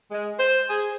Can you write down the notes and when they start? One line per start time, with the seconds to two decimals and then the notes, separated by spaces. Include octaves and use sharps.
0.11 G#3
0.38 C5
0.70 G#4